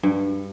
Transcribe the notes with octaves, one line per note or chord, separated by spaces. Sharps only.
G2